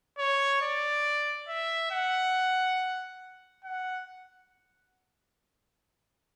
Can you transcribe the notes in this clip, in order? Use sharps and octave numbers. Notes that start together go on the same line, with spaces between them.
C#5
D5
E5
F#5
F#5